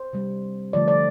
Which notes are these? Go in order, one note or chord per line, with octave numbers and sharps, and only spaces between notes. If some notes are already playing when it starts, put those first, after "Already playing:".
Already playing: C5
C3 G3
D3 F3 A3 D5
D5